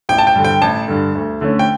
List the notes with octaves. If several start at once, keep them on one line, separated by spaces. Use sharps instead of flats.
A1 G5
A5
G5
G2 D3
G5
A1 A5
G2 D3
D2
D3 A3 C#4
G5